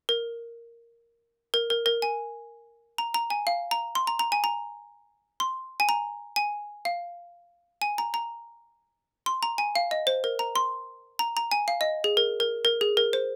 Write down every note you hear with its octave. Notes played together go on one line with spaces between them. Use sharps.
A#4
A#4
A#4
A#4
G#5
A#5
A#5
G#5
F5
A#5
C6
A#5
A#5
G#5
A#5
C6
G#5
A#5
G#5
F5
G#5
A#5
A#5
C6
A#5
G#5
F5
D#5
C5
A#4
A#5
C6
A#5
A#5
G#5
F5
D#5
G#4
A#4
A#4
A#4
G#4
A#4
C5